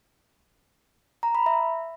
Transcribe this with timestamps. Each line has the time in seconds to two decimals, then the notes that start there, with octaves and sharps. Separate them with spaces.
1.23 A#5
1.35 B5
1.46 E5